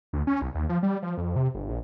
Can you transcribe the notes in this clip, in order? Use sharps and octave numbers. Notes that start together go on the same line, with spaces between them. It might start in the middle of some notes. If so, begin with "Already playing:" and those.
D2
C#4
C2
D#2
F3
G3
F3
F2
C3
G1
A#1